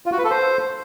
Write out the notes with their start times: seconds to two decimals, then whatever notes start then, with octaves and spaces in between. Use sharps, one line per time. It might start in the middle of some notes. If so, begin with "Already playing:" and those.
0.06 F4
0.12 F#4
0.18 B4
0.24 A4
0.31 C5